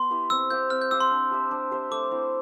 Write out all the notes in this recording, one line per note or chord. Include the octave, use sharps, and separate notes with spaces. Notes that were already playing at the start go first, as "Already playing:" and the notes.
Already playing: B3 E5 C6
E4 G4 B4
C4 E6
G4 C5 F5 G6
C4 F6
G6
G4 C5 F5 E6
C6
D4
G4 C5 E5
D4
G4 C5 E5
A3 D6
C4 E4